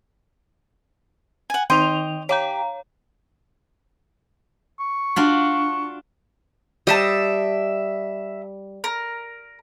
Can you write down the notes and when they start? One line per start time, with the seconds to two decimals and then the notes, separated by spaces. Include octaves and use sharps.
1.50 F#5 G#5
1.70 D#3 D#4 D#5 G5 C6 F7
2.29 G4 C#5 F5 A#5
4.80 C#6
5.16 D4 F4 F#4
6.87 G3 D#5 E5 A5
8.84 A#4